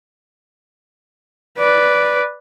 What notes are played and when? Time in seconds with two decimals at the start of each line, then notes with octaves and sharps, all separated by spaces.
1.58 B4 D5